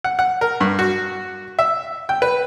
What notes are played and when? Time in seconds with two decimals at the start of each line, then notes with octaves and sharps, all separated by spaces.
0.04 F#5
0.19 F#5
0.41 A#4
0.61 G2
0.79 F#4
1.59 E5
2.09 G5
2.22 B4